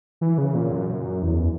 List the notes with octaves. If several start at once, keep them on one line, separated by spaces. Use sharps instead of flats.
E3
C#3
A#2
F#2
E2